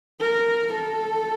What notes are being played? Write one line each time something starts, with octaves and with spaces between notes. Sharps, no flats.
A#4
A4